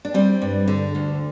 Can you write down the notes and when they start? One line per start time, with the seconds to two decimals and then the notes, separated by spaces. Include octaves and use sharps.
0.05 D4
0.14 G3 C4
0.42 G2
0.67 D3
0.95 D2